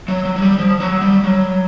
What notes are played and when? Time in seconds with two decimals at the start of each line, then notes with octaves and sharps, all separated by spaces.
0.08 F#3
0.25 F#3
0.36 F#3
0.42 G3
0.58 F3
0.80 F#3
1.02 G3
1.24 F#3